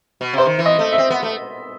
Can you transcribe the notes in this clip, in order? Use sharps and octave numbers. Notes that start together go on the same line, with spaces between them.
B2
C3 C5
D#3
E3
D#5
A3
E5
C4
B3
A3